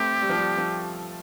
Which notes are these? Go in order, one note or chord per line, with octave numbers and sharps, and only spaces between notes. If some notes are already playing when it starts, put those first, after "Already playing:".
Already playing: A3 C4 G4
G3
F3
G3
F3